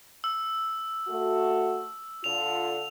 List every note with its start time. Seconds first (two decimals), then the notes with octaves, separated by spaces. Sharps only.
0.24 E6
1.08 A3 F#4
2.24 D3 F4 F7